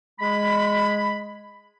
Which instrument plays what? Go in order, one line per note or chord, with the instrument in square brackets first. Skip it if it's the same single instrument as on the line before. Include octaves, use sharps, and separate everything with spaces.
[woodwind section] G#3 B5